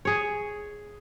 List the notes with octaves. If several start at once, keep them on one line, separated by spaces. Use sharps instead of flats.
G#4 C#5